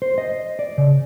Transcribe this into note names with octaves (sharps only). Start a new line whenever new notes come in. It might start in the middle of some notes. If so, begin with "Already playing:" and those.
C5
D#5
D5
C#3